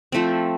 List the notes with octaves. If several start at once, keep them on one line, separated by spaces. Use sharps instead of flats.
F3 A3 C4